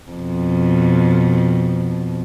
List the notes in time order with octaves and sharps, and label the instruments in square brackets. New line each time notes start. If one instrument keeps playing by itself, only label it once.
[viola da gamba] F2 B2